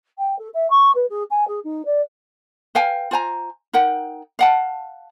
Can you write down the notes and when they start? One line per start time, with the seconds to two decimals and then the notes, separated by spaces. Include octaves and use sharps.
0.18 G5
0.38 A4
0.53 E5
0.70 C#6
0.95 B4
1.09 G#4
1.30 G#5
1.47 G#4
1.64 D#4
1.85 D5
2.75 B4 F5 G5 G#5
3.11 F4 C5 G#5 A#5
3.73 D#4 A#4 F#5 G5
4.39 F5 F#5 A5